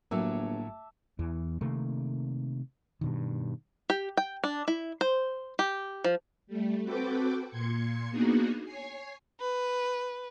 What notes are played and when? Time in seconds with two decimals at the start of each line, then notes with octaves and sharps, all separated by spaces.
0.11 G1 A2 F#3 A3 A#3 E5 A5 D6
1.19 E2 E3
1.61 C3 D#3 A3 A#3
3.01 G2 B2 D#3
3.90 G4
4.17 G5
4.44 D4
4.68 E4
5.01 C5
5.59 G4
6.04 F3
6.47 G3 A3
6.84 C4 F#4 A4 B4 G5 D6
7.50 A#2 C6 G#6 C#7
8.11 A#3 B3 D4 D#4 F#4 G#4
8.63 C#5 G#5 C7
9.40 B4